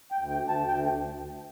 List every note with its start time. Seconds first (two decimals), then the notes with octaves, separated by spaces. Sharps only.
0.12 G5
0.18 D2
0.30 G5
0.42 D2
0.49 A5
0.67 D2 G5